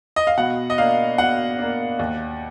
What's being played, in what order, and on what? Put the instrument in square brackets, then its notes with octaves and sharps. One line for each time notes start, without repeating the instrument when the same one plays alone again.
[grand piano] D#5
F5
B2 F#5
D#5
A#3 D4 F5
B2 F#5
A#3 D4
D#2